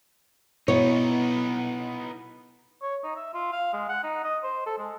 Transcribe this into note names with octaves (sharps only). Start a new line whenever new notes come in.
B2 B3 D#4 E4 C#5
C#5
D#4
E5
F4
F5
G#3
F#5
D#4
D#5
C5
A4
G#3